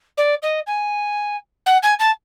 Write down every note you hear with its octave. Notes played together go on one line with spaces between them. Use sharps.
D5
D#5
G#5
F#5
G#5
A5